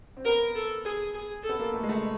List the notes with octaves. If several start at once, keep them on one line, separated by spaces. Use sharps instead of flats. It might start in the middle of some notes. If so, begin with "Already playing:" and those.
C4
B3 A#4
A4
G#4
G#4
A4
B3
A#3
A3
G#3
A3